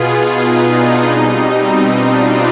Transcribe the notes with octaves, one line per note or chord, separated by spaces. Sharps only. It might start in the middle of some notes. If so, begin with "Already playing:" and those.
Already playing: B2 B3 F4 G#4
D#4
D4
B2 G3 C4 D#4
D4 F4